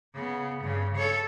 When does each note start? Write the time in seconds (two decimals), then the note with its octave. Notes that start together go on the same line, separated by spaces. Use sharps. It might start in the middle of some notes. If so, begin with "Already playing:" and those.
0.14 C#3 B3
0.62 G2 C#3
0.96 A4 C#5